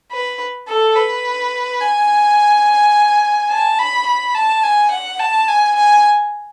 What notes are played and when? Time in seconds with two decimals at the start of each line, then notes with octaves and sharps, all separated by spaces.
0.12 B4
0.69 A4
0.96 B4
1.81 G#5
3.51 A5
3.79 B5
4.07 B5
4.35 A5
4.63 G#5
4.91 F#5
5.20 A5
5.48 G#5
5.76 G#5